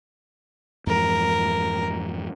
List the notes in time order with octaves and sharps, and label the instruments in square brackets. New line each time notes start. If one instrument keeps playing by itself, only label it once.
[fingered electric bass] F2 G#2 E3 [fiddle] A#4